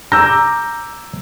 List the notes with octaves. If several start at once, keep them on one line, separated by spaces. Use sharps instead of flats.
A#5 D6 E6 G6